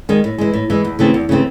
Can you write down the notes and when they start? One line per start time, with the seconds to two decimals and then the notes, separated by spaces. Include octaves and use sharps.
0.09 D#3 G#3
0.24 A2
0.38 E3 G#3
0.54 A2
0.70 E3 G#3
0.85 E2
0.99 C#3 E3 A3 C4
1.14 E2
1.29 C#3 E3 A3 C4